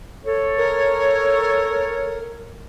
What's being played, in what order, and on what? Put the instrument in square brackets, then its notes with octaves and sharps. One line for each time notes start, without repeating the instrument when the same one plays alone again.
[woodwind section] A4 C#5
[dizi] A#4